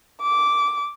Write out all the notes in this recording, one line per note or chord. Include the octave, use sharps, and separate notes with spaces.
D6